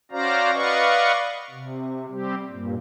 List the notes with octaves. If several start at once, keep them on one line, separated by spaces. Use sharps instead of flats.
C#4 F#4 C5 D5 F5 A#5
B4 D5 D#5 F5 F#5 C#6
C3
G3 C4 G4
G2 A#2